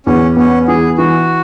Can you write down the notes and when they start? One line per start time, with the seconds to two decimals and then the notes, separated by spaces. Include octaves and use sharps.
0.06 E2 C#4
0.37 B3 C#4
0.68 E3 G#4
0.98 E3 F#4